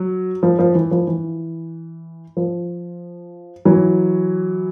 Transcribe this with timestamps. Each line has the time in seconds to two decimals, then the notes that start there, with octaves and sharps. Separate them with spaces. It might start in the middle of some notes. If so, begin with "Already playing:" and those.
Already playing: F#3
0.43 F3
0.59 F3
0.75 E3
0.91 F3
1.07 E3
2.37 F3
3.65 E3 F#3